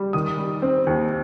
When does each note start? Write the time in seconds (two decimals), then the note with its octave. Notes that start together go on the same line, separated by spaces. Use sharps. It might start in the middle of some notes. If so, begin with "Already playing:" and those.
Already playing: G3
0.13 D#3 D#6
0.38 G3
0.62 C4
0.87 D#2